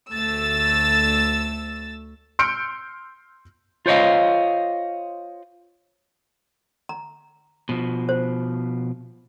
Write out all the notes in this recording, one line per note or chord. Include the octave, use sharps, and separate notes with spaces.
D2 A3 E6 A6
C6 E6 F6 G6 C#7 D7
F4 C5 C#5 D#5 F5
A#5
B2 F3
C5